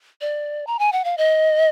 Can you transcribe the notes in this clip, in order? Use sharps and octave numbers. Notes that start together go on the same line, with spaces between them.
D5
A#5
G#5
F#5
F5
D#5